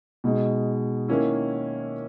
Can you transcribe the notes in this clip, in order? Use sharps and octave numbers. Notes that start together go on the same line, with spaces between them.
B2 G#3 D#4
D#3 A#3 C#4 E4